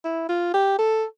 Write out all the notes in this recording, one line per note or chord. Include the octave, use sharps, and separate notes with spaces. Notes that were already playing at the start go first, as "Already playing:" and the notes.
E4
F4
G4
A4